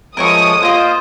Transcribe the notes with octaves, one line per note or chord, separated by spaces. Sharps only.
F3 G#3 A3 A#4 C#5 C#6 D#6
A#3 F4 C5 D#5